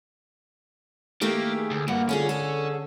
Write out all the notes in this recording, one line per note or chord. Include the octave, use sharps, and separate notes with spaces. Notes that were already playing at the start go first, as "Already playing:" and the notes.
D#3 A3 A#3 G4
G#4
D2
G2 A#2 A#3 F#5
D3 C#4 E4 F4 G#4
G#4 A4